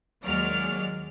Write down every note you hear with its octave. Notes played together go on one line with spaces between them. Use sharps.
D#2 F#3 G#3 A#3 D5 F6